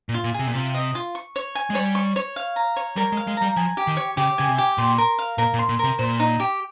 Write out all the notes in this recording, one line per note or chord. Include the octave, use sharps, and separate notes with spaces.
A#2
F4
A#2
C3 G#4
A#2
C3 F4
D#5
F4
C#6
C#5
G#5
G#3
G3 C#5
C#6
C#5
F5
A#5
C#5
G3 A#4
G#3
F5
G#3
G3 A#5
F3 G#5
G4
D#3
C#5
C#3 G4
C#3 G#5
C3
G4
A#2 C6
A#4
F5
A#2 A#4
A#2
C6
A#2
C3 A#4
A#2 C5
D#4
G4